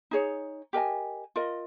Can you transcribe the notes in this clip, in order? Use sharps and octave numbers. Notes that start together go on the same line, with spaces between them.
D#4 G#4 C#5
G4 A#4 D#5 G#5
F4 A#4 D#5